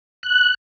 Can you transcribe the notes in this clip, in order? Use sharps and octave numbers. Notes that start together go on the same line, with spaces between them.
F#6